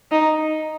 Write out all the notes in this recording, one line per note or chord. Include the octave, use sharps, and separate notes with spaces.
D#4